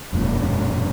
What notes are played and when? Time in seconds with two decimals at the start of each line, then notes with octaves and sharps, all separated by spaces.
0.13 E1 F#2 A#2